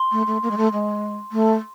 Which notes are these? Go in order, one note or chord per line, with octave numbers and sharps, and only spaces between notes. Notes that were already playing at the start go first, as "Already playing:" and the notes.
Already playing: C6
A3
A3
A#3
G#3
A3
G#3
A3